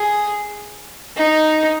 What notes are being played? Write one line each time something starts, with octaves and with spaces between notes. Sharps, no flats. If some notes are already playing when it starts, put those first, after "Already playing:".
Already playing: G#4
D#4